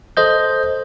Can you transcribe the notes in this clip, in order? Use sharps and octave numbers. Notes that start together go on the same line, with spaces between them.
A4 C5 D#5 G6